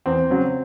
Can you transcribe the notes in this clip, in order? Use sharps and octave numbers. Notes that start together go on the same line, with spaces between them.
E2 C4
C#3 F#3